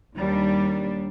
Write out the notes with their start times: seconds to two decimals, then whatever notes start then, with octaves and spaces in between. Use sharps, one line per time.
0.17 D#2 G3 D4